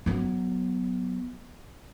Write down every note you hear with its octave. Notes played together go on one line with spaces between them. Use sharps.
F#3 B3